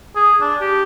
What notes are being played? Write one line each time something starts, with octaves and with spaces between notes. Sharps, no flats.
G#4
D4
G4